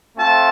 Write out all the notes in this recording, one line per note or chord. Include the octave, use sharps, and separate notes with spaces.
A3 C4 F4 A5